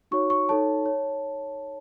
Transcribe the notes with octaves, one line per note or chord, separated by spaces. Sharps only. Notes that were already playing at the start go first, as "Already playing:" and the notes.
D#4 F#4 C#5 C#6
C#6
D#4 A4 C#5 A5
C#5